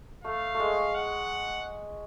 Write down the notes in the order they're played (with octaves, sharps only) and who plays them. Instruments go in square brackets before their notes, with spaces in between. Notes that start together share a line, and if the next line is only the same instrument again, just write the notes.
[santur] A3 [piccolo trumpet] F5
[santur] A3
G#3
[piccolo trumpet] F#5